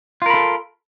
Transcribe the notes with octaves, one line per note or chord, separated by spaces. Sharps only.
F4 A4 A#4 B5